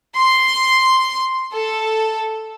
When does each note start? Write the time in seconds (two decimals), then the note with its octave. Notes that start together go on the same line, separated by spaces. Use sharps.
0.17 C6
1.53 A4